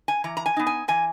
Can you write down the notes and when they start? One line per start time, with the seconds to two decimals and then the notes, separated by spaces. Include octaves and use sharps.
0.08 G#5
0.24 E3 A#5
0.37 A#5
0.46 G#5
0.57 B3 D#4
0.67 G#5
0.88 E3 G#5